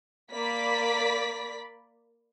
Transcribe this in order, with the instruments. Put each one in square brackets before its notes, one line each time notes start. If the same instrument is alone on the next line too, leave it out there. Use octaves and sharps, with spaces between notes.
[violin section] A#3 D5 B5 B6